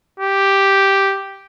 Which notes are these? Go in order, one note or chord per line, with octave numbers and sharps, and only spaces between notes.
G4